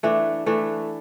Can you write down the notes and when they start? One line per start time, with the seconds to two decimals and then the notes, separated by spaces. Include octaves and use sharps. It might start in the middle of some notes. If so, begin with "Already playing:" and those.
0.03 E3 A3 D4
0.46 E3 A3 D4